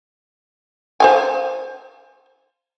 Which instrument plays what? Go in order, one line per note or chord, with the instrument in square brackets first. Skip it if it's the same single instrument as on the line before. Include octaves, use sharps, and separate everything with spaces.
[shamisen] C5 F5 G#5